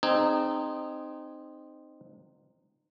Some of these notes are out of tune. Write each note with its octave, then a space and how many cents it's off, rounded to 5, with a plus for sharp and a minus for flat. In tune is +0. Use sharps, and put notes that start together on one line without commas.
C4 +0 D#4 -20 G#4 +0